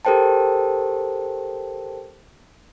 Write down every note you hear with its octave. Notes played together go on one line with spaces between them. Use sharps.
G4 A4 A#4 C5 G5 A5